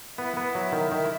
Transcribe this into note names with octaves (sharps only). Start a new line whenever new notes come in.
B3 E4
B3
F#3
D#3
D#3